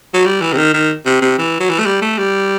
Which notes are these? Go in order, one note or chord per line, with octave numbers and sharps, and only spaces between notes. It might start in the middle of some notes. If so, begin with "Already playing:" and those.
F#3
G3
E3
C3
D#3
D#3
C3
C3
E3
F#3
E3
A3
G3
A3
G3